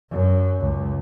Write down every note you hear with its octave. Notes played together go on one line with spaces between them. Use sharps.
F#2
C#2